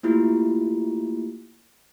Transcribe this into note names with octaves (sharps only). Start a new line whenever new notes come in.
A3 A#3 E4 F4 G4